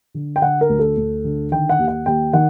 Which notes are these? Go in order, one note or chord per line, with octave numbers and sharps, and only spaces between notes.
D3
G5
D3 F#5
A#4
D2
A4
D2
D3
D#3 G5
F#5
D#2
F#5
D#2 G5
D#3 F#5